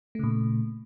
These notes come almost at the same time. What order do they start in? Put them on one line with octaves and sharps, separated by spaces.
A3 C#3 A#2